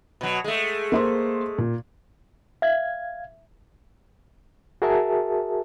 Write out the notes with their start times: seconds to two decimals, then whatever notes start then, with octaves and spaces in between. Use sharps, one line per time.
0.21 B2 F#3
0.44 G#3 A3
0.92 A#3 C5 C6
1.58 A#2
2.62 E5 F5 G#6
4.82 F#4 G#4 A#4 E5 A5